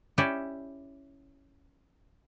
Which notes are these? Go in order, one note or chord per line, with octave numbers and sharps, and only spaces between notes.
C#4 E4 G4 D5